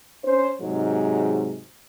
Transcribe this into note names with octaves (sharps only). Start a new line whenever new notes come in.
C#4 C5
G#2 C3 F#3 G#3